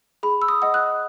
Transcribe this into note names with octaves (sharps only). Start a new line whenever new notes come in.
G#4 B5
E6
D#6
D#5 F#5
F#6